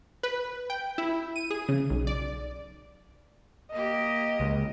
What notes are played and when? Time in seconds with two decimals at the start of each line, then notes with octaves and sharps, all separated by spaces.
0.23 B4
0.70 G5
0.98 E4
1.36 D#7
1.50 G#4
1.69 C#3
1.90 B1
2.07 D5
3.72 A#3 G4 D#5
4.40 C#2